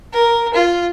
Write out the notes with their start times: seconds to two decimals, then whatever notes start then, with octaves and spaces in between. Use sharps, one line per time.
0.13 A#4
0.54 F4